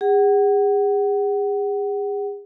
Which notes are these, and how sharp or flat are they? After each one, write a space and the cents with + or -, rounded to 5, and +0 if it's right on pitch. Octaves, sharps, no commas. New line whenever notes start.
G#4 -35 F#5 +25